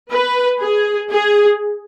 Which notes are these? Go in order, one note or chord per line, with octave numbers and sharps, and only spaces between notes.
B4
G#4
G#4